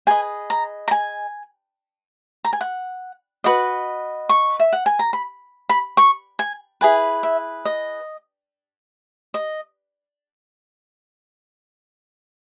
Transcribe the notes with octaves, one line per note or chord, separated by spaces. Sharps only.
G#4 B4 D#5 G#5
A#5
A#5
G#5
A#5
G#5
F#5
F#4 B4 D#5
C#6
E5
F#5
G#5
A#5
B5
B5
C#6
G#5
E4 G#4 B4 G#5
E5
D#5
D#5